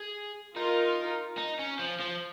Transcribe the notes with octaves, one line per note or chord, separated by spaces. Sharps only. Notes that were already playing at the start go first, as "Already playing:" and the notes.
Already playing: G#4
D#4 F4 A#4
D#4
C#4
F3
F3